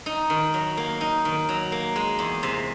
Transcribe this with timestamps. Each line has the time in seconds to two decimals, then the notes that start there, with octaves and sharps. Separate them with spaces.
0.06 D#4
0.30 D#3
0.54 F#3
0.77 A#3
1.01 D#4
1.25 D#3
1.49 F#3
1.72 A#3
1.96 G#3
2.19 E2
2.43 C3